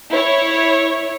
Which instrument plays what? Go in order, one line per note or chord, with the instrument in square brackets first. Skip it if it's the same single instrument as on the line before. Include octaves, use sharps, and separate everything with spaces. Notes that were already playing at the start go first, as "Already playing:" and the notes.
[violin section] E4 C#5